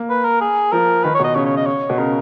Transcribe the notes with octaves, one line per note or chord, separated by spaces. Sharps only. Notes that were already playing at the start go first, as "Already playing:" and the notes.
Already playing: A#3
B4
A#4
G#4
F3 A#4
D#3 B4
B2 C#5
D#5
C#3 C#5
C#5
D#5
C#5
B2
C#3 A#4